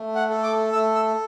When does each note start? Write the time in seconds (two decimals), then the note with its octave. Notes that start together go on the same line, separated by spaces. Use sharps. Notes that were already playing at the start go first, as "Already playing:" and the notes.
Already playing: A3
0.15 F#5
0.30 A4
0.43 D6
0.73 A3 E6
0.95 E6